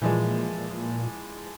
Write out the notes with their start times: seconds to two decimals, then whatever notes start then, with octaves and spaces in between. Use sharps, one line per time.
0.02 A#2 E3 F3 G#3